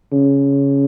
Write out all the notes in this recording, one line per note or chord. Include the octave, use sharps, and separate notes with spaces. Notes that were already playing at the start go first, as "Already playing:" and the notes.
C#3